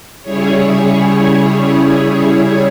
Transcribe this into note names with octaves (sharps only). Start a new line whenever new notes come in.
C#3 G3 E4 G#4 C#5